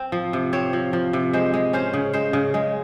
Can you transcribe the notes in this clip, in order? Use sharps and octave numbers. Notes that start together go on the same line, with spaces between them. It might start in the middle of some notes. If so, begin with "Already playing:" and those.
Already playing: C4
F3
C3
C4 C#5
F3
F3
C3
G#3 C5
G#3
C#4 C5
C#3
G#3 C5
C#3
G#3